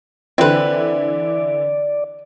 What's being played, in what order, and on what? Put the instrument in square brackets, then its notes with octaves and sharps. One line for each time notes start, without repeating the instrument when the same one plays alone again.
[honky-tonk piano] D3 E3 E4 [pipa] C4 B4 [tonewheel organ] D5